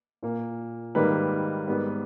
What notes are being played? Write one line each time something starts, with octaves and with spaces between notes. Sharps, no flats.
A#2 A#3
G#2 D#3 G3 A#3 B4
G#2 G3 B3